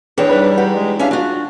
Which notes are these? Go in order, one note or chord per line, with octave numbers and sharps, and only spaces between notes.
E2 D4 G#4 B4 C#5 G5
G3 D#4 B4 B5
G4 F#5 A#5
G#3
C#4 D4 E5 F5
D4 F4 F#4